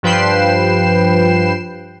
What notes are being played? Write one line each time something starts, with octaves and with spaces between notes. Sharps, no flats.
G2 F3 B4 G5 C7 E7